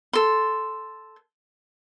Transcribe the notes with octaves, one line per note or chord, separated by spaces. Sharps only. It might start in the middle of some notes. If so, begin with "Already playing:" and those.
A4 C6